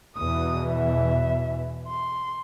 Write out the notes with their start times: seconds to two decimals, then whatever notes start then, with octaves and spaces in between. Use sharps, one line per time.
0.17 E2 B2 E3 D#6
0.70 E5
1.88 C6